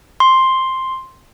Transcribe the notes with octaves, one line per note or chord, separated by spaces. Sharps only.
C6